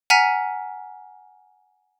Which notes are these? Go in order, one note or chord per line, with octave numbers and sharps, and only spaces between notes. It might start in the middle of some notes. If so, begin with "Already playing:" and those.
F#5 G#5 A#5 F6 B6 D#7